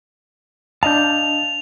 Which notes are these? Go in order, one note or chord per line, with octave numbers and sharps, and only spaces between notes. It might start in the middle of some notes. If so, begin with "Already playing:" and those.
D4 D#5 F5 A5 G6 F7